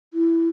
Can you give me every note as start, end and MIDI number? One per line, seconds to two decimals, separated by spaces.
0.14 0.49 64